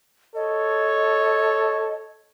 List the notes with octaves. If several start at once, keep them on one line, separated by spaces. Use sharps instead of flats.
A4 C#5 D#5